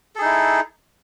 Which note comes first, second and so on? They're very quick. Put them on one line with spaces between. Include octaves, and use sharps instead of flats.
A4 G#4 D#4 E4